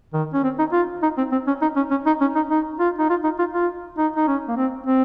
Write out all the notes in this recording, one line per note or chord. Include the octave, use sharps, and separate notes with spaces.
D#3
C#4
C4
D#4
F4
D#4
C4
C4
C#4
D#4
C#4
C#4
D#4
C#4
D#4
D#4
F4
D#4
F4
D#4
F4
F4
D#4
D#4
C#4
A#3
C4
C4